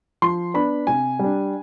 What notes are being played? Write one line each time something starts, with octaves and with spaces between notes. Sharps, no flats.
F3 C6
B3 D4 B5
C3 G#5
G3
D4